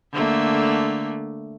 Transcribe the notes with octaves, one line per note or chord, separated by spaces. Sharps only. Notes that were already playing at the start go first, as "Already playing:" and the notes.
D3 A3 A#3